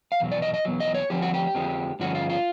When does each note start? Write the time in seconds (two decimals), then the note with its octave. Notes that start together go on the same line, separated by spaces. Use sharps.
0.12 F5
0.20 E2 B2 F#3
0.32 D5
0.42 D#5
0.54 D#5
0.65 E2 B2 F#3
0.80 D#5
0.95 C#5
1.10 F2 D3 F3 C4 G4
1.22 F#4
1.34 G4
1.55 F2 D3 F3 G#3 C4
1.99 G2 D3 F3 G#3 C#4 F#4
2.15 F4
2.30 F4